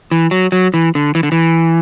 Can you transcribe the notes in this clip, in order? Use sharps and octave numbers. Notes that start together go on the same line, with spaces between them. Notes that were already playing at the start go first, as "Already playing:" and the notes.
E3
F#3
F#3
E3
D3
E3
D3
E3